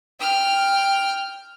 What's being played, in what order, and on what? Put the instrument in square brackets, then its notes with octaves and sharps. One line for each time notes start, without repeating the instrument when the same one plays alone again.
[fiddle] G5 F6